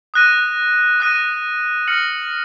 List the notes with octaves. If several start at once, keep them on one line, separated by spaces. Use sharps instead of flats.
D#6 F#6 A#6 D#7
D#6 F#6 A#6 D#7
F6 A#6 C#7 F#7